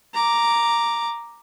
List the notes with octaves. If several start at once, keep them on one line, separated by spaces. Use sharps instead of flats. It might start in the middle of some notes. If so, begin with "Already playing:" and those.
A#5 D6